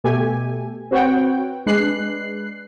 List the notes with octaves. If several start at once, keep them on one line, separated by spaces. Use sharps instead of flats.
B2 A3 G4 A4 G#5
C4 F#4 B4 C#5 F#5 G5
G#3 D4 B4 F#6 C7